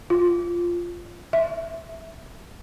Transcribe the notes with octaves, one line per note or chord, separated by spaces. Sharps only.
F4
E5